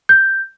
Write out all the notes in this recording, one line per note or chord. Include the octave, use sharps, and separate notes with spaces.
G6